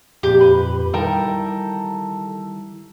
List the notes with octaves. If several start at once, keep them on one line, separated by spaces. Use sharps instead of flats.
F2 A#2 G4
B4
D#3 G3 E4 A4 A#4 G5